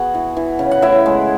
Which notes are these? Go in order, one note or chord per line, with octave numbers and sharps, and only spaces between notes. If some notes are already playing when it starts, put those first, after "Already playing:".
Already playing: B3 F#4 G#4 F#5
E3
E3
C#3
F#5
A2 E4 E5
G#3